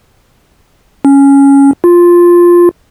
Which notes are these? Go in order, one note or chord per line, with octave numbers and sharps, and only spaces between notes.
C#4
F4